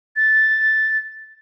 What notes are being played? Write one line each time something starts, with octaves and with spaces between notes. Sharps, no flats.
A6